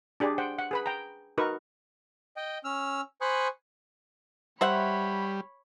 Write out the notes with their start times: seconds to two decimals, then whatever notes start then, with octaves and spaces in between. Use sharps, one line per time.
0.20 D4 G4 G#4 D5
0.38 C5 F#5 G5
0.59 F#5
0.71 G#4 B4 B5
0.86 G5 A#5
1.38 D#4 F#4 A#4 B4 C#6
2.37 D#5 G5
2.64 C#4 E6 F6
3.21 C5 G#5 B5 C#6 D#6 F#6
4.61 G3 C5 C#5 E5 F#5 B5